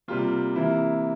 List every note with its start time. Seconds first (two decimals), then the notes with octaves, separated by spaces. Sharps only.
0.08 C3 G3 A#3 F4
0.56 C3 E3 A#3 E4